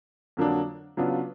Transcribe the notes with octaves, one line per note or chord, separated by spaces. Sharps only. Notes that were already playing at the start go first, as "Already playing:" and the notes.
F2 D3 F#3 A#3 D4
C#3 F#3 B3 D4 F4